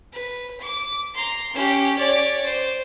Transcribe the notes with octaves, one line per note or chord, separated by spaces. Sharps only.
B4
D6
A#5 C6
C#4 G4
C#5 D5
C5